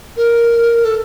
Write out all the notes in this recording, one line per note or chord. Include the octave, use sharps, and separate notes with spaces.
A#4
A4